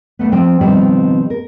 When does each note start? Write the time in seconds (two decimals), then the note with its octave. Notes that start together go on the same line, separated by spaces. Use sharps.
0.19 D#2 A3 B3
0.32 F3 C4 G5
0.61 B2 D#3 F3 G3 C4
1.30 A#4